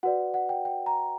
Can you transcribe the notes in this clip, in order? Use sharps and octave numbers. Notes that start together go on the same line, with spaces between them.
F#4 B4 D5 F#5
F#5
G5
G5
A#5